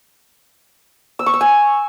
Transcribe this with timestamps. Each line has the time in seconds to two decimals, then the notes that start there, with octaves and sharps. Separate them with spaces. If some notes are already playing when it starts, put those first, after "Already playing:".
1.19 E6
1.26 C#6
1.34 E6
1.41 G#5